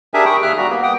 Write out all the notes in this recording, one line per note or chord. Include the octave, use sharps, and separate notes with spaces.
D4 G4 G#4 A#4 E5 G#5
G5 B5 C#6 D#6
D#2 G#4 E5 F6 F#6
G3 F#4 A#5
A#3 B3
F#5 G5 D#6